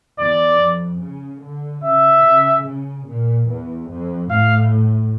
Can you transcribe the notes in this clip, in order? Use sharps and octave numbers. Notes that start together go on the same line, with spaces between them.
E2 D5
F2
C#3
D3
C#3 E5
C#3
C#3
A#2
E2
F2
A2 F5